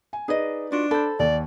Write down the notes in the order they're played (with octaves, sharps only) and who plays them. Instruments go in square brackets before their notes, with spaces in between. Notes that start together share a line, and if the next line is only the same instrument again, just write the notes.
[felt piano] G#5
[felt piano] D#4 B4 D5 [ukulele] G#4 D#5
[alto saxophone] D4 [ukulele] F4 F#4
[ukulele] A4 C5 [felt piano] B5
[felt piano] D#2 [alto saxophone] D5